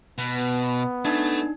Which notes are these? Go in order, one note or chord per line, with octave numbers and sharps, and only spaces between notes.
B2 B3
A3 D4 D#4 A4